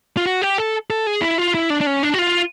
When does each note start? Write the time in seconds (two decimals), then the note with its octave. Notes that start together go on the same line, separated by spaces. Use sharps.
0.17 F4
0.26 F#4
0.42 G4
0.58 A4
0.90 A4
1.07 G#4
1.22 E4
1.38 F4
1.55 E4
1.70 D4
1.81 D4
1.87 C#4
2.03 D4
2.14 F#4
2.19 F4